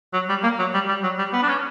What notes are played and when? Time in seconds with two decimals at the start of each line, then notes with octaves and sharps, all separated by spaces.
0.13 F#3
0.29 G3
0.43 A#3
0.59 F#3
0.74 G3
0.88 G3
1.03 F#3
1.18 G3
1.33 B3
1.42 D4
1.49 C#4